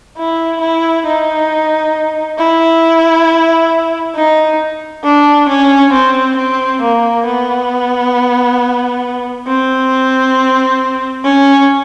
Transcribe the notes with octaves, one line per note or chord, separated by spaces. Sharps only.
E4
E4
D#4
E4
D#4
D4
C#4
C4
C4
A#3
B3
C4
C#4